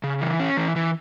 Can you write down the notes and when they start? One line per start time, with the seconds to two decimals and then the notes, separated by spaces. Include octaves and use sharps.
0.04 C#3
0.21 E3
0.40 C#4
0.57 E3
0.76 E3